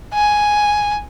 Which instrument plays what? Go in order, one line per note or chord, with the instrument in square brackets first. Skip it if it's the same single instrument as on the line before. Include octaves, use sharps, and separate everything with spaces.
[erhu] G#5